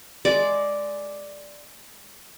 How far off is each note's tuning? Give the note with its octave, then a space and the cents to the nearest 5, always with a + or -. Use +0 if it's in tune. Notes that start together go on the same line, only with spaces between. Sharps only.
G#3 +10 D5 +0